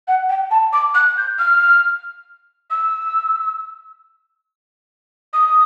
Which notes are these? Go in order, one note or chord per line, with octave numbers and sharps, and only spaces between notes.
F#5
G5
A5
D6
F#6
G6
F6
E6
D#6